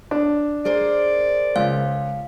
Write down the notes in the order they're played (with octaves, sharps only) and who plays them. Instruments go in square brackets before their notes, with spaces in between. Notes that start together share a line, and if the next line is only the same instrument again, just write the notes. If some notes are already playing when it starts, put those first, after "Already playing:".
[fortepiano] D4
[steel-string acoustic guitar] G#4 A#4 C5 [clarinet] D5
[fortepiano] C#2 [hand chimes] F5